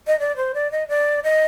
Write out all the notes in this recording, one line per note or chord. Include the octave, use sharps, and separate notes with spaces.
D#5
D5
C5
D5
D#5
D5
D#5